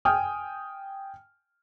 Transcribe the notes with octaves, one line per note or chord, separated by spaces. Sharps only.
G5 G#5 D#6 F6